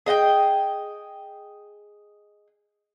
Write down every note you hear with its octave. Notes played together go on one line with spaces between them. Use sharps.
G#4 D#5 F#5 G5